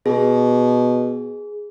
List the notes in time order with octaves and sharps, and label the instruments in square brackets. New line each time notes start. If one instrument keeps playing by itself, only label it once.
[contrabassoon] B2 [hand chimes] G#4